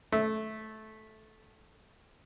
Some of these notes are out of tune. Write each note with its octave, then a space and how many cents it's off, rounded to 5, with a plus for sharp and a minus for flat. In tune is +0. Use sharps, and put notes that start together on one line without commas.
A3 -15